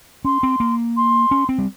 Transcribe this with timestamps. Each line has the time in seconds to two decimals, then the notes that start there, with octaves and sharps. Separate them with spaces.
0.25 C#4 C6
0.43 C4
0.60 A#3
0.97 C6
1.31 C#4
1.49 C4
1.58 G3